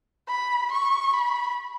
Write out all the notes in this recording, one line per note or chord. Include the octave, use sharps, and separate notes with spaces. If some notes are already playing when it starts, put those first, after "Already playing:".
B5
C#6
B5